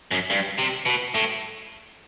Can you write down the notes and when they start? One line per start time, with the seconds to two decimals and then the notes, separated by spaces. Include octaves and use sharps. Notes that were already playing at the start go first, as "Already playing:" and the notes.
0.11 F#2
0.30 G2
0.59 C3
0.86 B2
1.15 A2